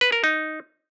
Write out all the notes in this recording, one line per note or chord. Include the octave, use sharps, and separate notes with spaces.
B4
A#4
D#4